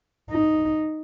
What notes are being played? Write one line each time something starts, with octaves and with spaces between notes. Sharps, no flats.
D#4